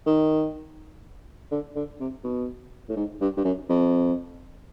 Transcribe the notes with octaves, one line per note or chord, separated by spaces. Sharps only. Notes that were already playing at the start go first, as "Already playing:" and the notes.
D#3
D3
D3
C3
B2
A2
G#2
G2
G2
F#2
F2